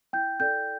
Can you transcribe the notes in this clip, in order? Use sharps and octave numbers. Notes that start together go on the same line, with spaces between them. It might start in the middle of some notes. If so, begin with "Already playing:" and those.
E4 G5 G6
A4 D5 G5 G6